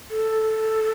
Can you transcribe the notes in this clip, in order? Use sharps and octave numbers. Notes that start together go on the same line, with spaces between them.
A4